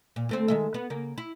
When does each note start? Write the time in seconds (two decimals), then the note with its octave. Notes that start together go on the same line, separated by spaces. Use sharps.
0.16 A#2
0.29 D2 A3 C4
0.48 D#3 G#3 E5
0.74 B3
0.90 C#3 A#3
1.18 E4